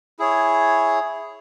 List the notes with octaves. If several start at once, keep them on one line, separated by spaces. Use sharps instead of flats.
E4 G#4 C#5